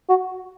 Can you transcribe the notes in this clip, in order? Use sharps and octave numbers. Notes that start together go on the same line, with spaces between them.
F#4